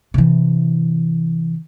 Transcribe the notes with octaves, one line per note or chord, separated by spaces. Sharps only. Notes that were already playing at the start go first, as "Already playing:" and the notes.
C3 E3